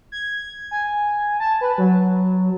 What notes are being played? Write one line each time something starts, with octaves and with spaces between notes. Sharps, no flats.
G#6
G#5
A5
B4
F#3